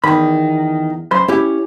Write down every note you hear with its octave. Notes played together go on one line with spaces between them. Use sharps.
E2 D#3 B5
F#2 C5 B5
C#4 E4 G4